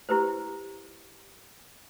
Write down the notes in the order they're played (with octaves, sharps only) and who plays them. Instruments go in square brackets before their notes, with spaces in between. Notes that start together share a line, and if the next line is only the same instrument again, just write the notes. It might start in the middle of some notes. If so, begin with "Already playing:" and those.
[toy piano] E4 G4 B4 C5